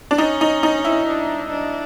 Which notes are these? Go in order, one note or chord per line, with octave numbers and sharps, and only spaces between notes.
D4
C#4 D#4
D#4
D#4
E4
D4
D4